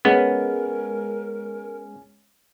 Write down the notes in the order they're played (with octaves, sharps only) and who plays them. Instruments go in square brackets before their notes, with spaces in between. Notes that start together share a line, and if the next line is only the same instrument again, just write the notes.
[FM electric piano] G#3 [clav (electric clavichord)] B3 [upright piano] C#4 [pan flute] A#4